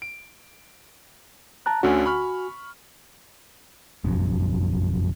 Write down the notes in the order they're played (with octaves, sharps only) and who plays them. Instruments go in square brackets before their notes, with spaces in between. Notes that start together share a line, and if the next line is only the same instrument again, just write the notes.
[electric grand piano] D7
[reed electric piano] A5 A#5 F#6
[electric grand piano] D2 D3 C#4 [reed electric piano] F#4 G#5
[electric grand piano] B5 C#6 F6
[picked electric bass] F1 A#1 F#2